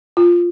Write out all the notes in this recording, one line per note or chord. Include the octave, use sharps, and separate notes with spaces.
F4